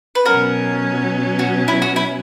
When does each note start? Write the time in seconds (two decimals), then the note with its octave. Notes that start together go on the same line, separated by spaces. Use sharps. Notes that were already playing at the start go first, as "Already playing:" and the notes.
0.15 B4
0.25 B2 F#3 C#4 F#4 A#4
1.39 F#4
1.68 E4
1.82 F#4
1.96 E4